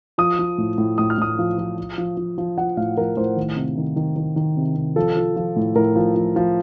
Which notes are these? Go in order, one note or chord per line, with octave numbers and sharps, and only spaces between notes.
F3 D#6
F3
A2
A2
A2 D#6
F6
A2 D#6
F3
F3
F3
F3
F3
F3
F3 F#5
A2 F5
F3 A#4
A2 C5
D#3
C3
D#3
D#3
D#3
D#3
C3
C3
F3 A4
F3
F3
A2
A2 A#4
F3
F3
F3